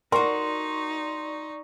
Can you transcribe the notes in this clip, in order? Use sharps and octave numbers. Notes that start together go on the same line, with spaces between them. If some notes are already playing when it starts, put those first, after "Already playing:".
D#4 F#4 A#4 D5 C6 C#6